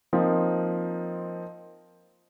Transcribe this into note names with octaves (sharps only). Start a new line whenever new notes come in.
F3 A#3 C4 D#4